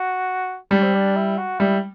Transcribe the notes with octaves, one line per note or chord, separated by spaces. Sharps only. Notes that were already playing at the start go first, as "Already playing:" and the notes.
Already playing: F#4
G3 D4
C4
D4
E4
F#4
G3 E4